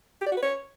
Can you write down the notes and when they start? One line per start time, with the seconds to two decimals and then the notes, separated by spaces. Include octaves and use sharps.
0.21 G4
0.26 D5
0.32 F#4
0.37 B4
0.43 C#5